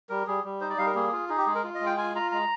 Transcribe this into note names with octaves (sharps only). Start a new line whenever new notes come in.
G3 A#4
G3 G#4
G3
D#4 C5
D5
G3 F5
A#4
A#3 G#4
F4
D#4 G#4
G4
G#3 G#4
A#4
F4
D#5
G#3
G5
F4 G#5
F4 A#5
G#3 A#5